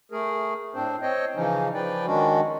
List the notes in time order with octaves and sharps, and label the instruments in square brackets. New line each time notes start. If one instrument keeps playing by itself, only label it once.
[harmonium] A3 G#4 A#4
A2 C4 D4 C5
C4 C5 C#5 D#5 G5
C#3 E3 F3 C#4 D#4
F3 B4 D5 G5
D#3 G#3 C#4 D4 F#4